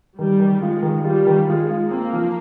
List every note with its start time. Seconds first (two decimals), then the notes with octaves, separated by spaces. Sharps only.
0.19 D#3 G3
0.40 D#3
0.62 G#3 F4
0.83 D#3
1.05 G3 F4
1.27 D#3
1.48 G#3 F4
1.70 F4
1.91 A#3 C4
2.13 F3